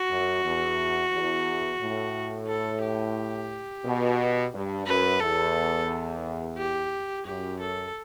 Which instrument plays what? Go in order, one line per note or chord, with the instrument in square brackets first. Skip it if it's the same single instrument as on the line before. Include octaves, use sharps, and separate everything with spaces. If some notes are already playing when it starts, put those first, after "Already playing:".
Already playing: [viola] F#4
[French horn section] F#2
E2
E2
A2
[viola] A4
G4
[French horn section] B2
G2
[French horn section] F#2 [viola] B4
[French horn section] E2 [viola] A4
[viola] G4
[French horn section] F#2 [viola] G4
[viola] A4